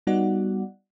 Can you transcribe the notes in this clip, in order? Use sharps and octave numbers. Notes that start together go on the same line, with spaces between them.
G3 B3 D#4 F#4 D5 F#5